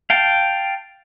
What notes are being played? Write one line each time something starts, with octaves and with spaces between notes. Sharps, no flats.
F5 G5 A5